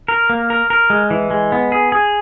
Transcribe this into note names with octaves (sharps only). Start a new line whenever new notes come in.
A#4
A#3
A#4
A#4
G#3
E3
G#3
B3
G#4
G#4